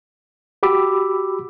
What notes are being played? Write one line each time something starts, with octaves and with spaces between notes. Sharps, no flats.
F#4 G4 B5 D6 E6